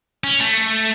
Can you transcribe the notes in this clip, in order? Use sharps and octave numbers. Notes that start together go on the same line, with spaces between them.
C#4
A3